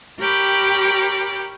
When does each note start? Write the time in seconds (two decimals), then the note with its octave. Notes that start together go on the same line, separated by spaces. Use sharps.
0.20 G4 A#4 C#5 G5 B5 D6